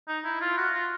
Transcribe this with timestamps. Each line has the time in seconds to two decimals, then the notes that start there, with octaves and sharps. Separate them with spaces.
0.08 D#4
0.25 E4
0.41 F4
0.58 F#4
0.74 F4